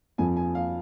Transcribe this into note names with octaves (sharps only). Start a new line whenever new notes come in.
F2 F3 G#5
G#5
F5